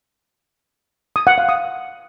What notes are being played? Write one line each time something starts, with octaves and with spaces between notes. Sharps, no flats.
D#6
F#5
F5
D#6